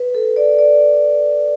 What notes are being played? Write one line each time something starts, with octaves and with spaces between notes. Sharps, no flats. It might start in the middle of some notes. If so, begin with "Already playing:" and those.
Already playing: B4
A4
D5
D5